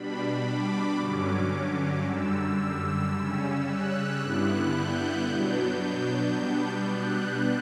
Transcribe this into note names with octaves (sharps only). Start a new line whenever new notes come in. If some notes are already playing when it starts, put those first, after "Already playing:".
Already playing: B2 G3 D4 B5
D6
G2 D3 F#3 C#4
F#2 D3 G3 E6
C#3 G3 C#4
F#6
G2 D3 G3 B3 E4
G6
B2 F#3 B3 D4
G6
B2 G3 B3 D4
F#6